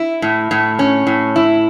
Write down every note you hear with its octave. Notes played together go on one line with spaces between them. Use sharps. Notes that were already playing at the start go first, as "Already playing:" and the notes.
Already playing: E4
A2
A2
C#4
A2
E4